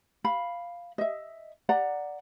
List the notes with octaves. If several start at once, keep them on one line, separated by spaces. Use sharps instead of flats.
F5 B5
D#5 E5
D5 F#5 A#5